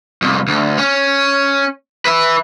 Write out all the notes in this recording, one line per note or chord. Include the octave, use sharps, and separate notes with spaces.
C2 F2
D2
C#4
B4 E5